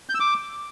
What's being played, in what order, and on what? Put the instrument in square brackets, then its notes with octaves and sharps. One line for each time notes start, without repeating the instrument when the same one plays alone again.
[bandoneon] G6
E6
D6